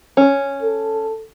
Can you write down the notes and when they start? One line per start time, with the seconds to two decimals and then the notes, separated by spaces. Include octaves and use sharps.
0.17 C#4
0.63 A4